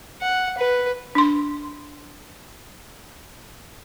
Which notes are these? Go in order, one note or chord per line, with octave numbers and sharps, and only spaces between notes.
F#5
B4
D4 C6